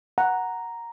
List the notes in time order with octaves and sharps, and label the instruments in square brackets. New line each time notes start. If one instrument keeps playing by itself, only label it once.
[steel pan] F#5 [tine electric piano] A#5